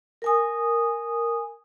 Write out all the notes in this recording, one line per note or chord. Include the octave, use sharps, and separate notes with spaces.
A#4 G#5 D#6